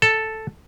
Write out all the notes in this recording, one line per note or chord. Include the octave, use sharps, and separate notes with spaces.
A4